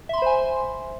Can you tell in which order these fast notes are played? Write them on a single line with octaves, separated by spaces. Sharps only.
E5 C6 B5 C5 G#5